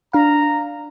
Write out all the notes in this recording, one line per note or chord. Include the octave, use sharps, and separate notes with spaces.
D4 F5 A#5